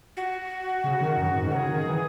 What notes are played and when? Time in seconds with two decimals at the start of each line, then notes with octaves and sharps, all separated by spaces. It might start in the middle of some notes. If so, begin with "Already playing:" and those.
0.17 F#4
0.84 C#3
1.01 D#3
1.18 F#2
1.35 G#2
1.47 D#3
1.51 C#3 A#4
1.56 G#4
1.69 D#3
1.86 E3